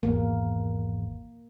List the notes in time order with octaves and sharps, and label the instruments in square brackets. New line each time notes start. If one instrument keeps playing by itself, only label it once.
[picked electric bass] G#1 E2 [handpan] A#3